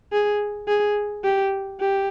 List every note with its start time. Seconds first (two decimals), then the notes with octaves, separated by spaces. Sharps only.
0.12 G#4
0.68 G#4
1.24 G4
1.80 G4